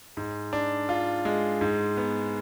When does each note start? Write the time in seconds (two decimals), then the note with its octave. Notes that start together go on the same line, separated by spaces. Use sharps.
0.17 G#2
0.53 D4
0.89 F4
1.25 G#3
1.61 G#2
1.97 B3